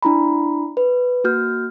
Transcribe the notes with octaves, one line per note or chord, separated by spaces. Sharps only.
D4 E4 A#5 B5
B4
A#3 F#4 F6 G6